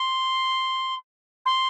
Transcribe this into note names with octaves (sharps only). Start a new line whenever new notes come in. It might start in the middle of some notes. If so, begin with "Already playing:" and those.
Already playing: C6
C6